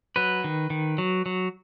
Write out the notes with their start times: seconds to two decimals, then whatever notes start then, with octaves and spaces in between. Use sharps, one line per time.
0.16 F#3 B4
0.44 D#3
0.70 D#3
0.98 F#3
1.26 F#3